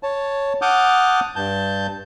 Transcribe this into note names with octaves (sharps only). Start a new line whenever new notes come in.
C#5 A5
F#5 A5 D6 D#6 F6 G6
G2 A5 G6